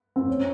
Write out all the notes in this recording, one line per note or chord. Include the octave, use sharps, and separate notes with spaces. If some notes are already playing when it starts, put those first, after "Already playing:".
C4
C#4